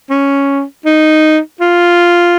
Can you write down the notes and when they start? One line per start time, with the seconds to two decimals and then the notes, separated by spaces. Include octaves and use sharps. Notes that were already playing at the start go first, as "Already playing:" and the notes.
0.10 C#4
0.85 D#4
1.61 F4